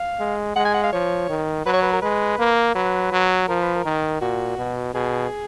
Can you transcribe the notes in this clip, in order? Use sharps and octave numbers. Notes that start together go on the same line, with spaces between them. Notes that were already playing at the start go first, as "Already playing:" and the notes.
Already playing: F5
G#3
G#3 F#5
G#5
F#5
F5
F3 C#5
D#3
F#3 B4
C#5
B4
A#4
G#3 B4
A#3
F#3 B4
F#3
F3 A#4
B4
A#4
D#3
A#2 F#4
B2
B2 G#4